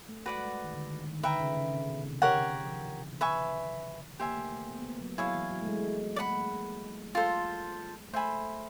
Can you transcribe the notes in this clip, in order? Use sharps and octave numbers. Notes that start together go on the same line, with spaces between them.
A3
G#3 F#4 B4 D5 F#5
G3
G#3
D#3
D3
D#3
D#3
D#3
D3 B4 E5 G5 A#5
C#3
C#3
C3
B2
C3
C#3 G4 A#4 C#5 F#5
D3
F3
E3
B4 E5 G#5 C#6
A#3 G4 C5 E5 G#5
A3
A3
B3
B3
A#3
F#3
F#3 E4 G#4 C#5 F5
E3
F#3
A3
G#3
A3 D5 F#5 B5
A#3
A3
F4 A4 C5
A3 C5 E5 G#5 B5